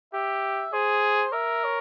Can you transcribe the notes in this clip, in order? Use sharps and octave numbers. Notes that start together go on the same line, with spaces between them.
G4 E5
G#4 C5
A#4 E5
C#5